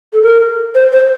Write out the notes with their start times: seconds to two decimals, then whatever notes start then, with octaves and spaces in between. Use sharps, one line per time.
0.13 A4
0.22 A#4
0.75 C5
0.92 C5